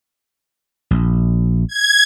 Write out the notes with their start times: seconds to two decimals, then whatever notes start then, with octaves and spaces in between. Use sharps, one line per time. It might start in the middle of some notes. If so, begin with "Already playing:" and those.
0.91 A#1
1.68 G#6